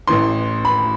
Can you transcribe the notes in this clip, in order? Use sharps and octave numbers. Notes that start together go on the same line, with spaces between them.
A1 A2 E3 C6
B5